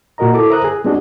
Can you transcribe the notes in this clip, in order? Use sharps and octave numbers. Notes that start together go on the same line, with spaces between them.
A#2 F#4 A#4 D#5 A#5
E4 A4 D6
A#4 C5 E5 A#5 D#6 F#6
G#4
G#3 B3 D4 F#4 G#4 D#5